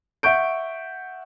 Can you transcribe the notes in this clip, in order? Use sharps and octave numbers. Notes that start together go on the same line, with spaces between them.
E5 F#5 C#6 G6 D7